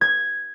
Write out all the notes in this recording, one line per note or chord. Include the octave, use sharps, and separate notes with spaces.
G#6